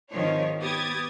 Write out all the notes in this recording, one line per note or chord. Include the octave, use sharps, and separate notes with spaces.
G#1 D#3 F3 C#5
B3 G4 D#6 G#6 A6